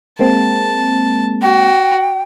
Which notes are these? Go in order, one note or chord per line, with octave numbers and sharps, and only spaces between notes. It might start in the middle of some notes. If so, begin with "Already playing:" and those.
G#3 A#3 C4 A5
F#4 G5